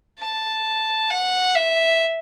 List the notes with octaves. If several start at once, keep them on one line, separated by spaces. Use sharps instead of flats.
A5
F#5
E5